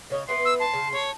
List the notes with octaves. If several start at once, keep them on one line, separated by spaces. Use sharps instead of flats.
C#3 C#5 D#5
B3 E4 B4 C6
E6
A5 C6
C#3
A4 C#5